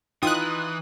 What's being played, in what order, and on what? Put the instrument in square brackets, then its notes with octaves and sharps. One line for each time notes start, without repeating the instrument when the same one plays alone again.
[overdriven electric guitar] E3 [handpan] D#4 [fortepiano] F4 G5 [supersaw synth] D#6 F#6